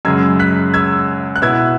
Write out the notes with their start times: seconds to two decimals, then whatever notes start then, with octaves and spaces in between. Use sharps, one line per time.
0.05 F#2 C#3 G#3 E6 G#6
0.39 F#6 B6
0.74 E6 G#6
1.36 F#6
1.42 B2 B3 E4 E6 G#6